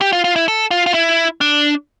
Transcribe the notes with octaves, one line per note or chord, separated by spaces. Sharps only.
G4
F4
F4
E4
A4
F4
F4
E4
D4